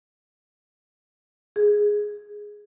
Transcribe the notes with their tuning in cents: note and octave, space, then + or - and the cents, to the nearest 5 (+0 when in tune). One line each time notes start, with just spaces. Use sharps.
G#4 +0